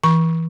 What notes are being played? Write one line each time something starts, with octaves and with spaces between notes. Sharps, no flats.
E3 C#6